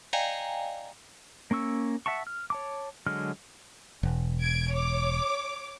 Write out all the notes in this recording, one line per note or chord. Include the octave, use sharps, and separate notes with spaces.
D5 D#5 F5 G5 G#5 A#5
A#3 C#4 C#6 E6
E5 F#5 A5 C#6
F6
C#5 A5 D6
D3 F#3 G#3 F6
E1
G#6 D7
C#5 D6